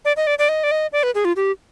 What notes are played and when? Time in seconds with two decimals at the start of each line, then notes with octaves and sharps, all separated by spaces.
0.05 D5
0.17 D#5
0.27 D5
0.39 D5
0.49 D#5
0.64 D5
0.71 D#5
0.93 D5
1.03 B4
1.15 G#4
1.25 F4
1.36 G4